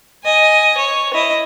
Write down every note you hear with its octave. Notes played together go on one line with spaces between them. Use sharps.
D#5 G#5
C#5
E4 D#5